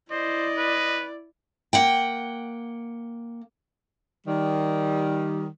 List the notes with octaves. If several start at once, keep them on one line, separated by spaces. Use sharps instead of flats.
E4 C5 D5 D#5
B4
A#3 F#5 G5
D#3 G3